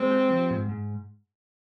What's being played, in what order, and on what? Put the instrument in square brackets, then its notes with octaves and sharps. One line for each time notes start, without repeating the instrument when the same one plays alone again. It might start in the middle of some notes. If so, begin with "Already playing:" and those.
Already playing: [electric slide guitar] G#3 [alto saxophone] C4
[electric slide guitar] G4
F3
G#2
G#2